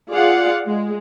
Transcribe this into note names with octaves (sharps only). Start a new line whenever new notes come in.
F4 G#4 D5 F5 F#5
G#3